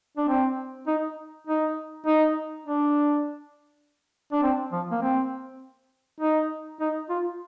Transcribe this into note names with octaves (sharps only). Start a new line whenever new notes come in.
D4
C4
D#4
D#4
D#4
D4
D4
C4
F3
A#3
C4
D#4
D#4
F4